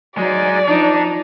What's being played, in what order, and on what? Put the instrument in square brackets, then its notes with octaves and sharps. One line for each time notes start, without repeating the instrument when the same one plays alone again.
[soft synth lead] F#3 [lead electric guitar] G#3 D#4 [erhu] D5
[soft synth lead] F3 [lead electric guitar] D4 [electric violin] D#4